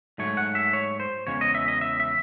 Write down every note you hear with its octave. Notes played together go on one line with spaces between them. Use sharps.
G#2 F#3 A3 C#5
F#5
E5
C#5
C5
E2 C#3 G#3 C#5
D#5
E5
D#5
E5
E5